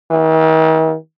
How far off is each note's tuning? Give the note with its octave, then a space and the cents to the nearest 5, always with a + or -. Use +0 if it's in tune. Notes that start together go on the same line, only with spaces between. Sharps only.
D#3 +45